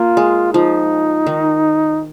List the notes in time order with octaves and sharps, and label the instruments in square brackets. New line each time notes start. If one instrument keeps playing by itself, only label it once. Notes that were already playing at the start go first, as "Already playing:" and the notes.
Already playing: [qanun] A#3 [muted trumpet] F4
[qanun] G#3
[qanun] F3 [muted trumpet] D#4
[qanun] D#3